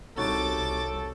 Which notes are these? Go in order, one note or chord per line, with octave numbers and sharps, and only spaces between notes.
C2 C#4 D#4 F#4 A4 D6 A6